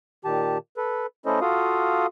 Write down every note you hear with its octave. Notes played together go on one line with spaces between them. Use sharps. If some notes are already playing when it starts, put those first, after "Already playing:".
A#2 D#3 G4 A5
A4 B4
A3 C#4 E4 A4 C5 D#5
F4 F#4 A4 F5 D#6